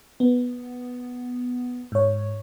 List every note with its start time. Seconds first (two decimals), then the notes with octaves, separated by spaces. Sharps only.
0.20 B3
1.92 G#2 C#5